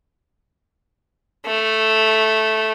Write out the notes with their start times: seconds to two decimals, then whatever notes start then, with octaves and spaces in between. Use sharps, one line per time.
1.46 A3